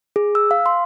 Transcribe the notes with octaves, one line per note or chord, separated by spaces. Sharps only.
G#4
E6
F5
C6